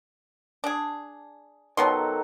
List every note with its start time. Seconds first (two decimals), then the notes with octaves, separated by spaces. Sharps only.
0.64 D4 G#4
1.77 B2 D#3 F#3 B3 A4 C6